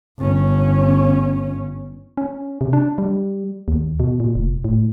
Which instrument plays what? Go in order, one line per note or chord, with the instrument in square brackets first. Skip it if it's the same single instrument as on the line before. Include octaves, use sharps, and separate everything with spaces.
[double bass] G1 C#4
[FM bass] C#4
C3
D4
G3
D#2
B2
A#2
F1
A2